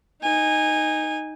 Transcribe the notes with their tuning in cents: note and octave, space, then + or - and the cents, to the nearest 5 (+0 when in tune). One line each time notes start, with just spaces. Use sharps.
D#4 +0 G#5 -20